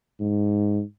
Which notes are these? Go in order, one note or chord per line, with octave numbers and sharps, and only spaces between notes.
G#2